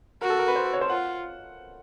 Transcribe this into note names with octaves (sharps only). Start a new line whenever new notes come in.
F#4 A#4
A4
A#4
B4
C5
B4
C#5
C5
F4 F#5